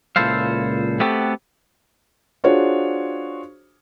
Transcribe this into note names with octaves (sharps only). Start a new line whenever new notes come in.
C#2 A#2 E4 A4 C5 F5
A3 B3 C4 F#4 G4 A4
D4 F4 F#4 G#4 C5 C#5